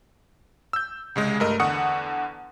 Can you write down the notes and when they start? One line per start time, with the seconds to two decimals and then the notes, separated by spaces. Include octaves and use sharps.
0.73 E6 G6
1.16 C2 C#3 G#3
1.40 G2 A3 A#4 D#5 E6
1.60 E2 D3 F#5 C#6 D#6 C#7